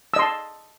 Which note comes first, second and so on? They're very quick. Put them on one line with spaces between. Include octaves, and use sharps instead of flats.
E6 D#5 C6 A5